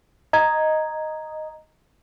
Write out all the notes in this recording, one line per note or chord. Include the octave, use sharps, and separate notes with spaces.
D#5 A#5 G#6